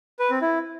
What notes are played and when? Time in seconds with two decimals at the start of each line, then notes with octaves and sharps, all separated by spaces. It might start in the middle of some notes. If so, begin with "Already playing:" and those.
0.19 B4
0.30 C4
0.42 E4